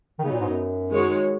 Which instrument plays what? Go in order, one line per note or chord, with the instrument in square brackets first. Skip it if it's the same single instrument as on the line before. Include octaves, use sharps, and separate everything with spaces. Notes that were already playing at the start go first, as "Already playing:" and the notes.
[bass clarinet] D#3
[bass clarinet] C#3 [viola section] F#3 B3 D#4
[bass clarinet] A#2
G#2
F#2
[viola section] D#3 G#3 D#4 F#4 C#5